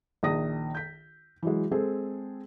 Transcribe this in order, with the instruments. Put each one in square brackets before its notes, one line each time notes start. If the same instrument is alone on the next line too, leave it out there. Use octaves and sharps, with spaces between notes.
[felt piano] A#1 D#3 D#6 A#6
G6 B6
E3 F#3 G#3
G#3 C4 G#4 A4